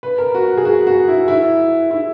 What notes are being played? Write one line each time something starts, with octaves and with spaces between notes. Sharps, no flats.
B4
A#4
F#4
G#4
F#4
F#4
E4
E4
E4